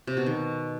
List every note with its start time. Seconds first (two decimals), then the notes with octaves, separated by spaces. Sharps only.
0.07 C3
0.17 B2
0.26 D#3